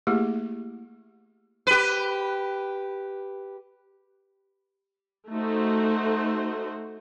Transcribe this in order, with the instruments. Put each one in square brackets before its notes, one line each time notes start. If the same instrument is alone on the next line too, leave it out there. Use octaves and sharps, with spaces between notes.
[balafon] A3 A#3 E4 G4 G#4
[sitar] G4 B4
[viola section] A3 D#4 F#4 C5